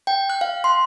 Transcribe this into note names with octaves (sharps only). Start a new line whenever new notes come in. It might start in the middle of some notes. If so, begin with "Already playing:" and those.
G5
F#6
F5
C6